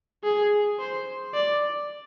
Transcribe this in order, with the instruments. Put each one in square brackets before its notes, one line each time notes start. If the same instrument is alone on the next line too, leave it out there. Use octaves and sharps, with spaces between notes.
[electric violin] G#4
C5
D5